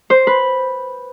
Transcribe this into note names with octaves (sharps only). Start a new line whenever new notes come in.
C5
B4